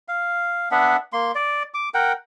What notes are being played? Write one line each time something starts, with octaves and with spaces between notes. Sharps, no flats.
F5
B3 D4 E5 F#5
A#3 C6
D5
D6
A#4 F#5 G5